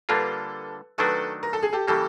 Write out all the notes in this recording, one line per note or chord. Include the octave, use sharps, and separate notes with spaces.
D3 G3 A#3 D4 F4 A4 B4
D#3 F#3 A3 D4 F#4 A4 B4
A#4
A4
G#4
G4 A4
C#3 E3 G3 A#3 G4 A4